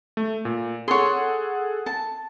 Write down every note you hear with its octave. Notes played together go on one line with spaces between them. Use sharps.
A3
A#2
G#4 A4 C#5 F#5 C6
A5